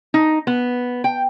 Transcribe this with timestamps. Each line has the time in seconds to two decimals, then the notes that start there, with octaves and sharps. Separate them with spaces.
0.14 D#4
0.47 B3
1.04 G5